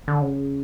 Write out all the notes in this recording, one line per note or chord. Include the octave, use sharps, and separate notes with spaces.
D3
C#3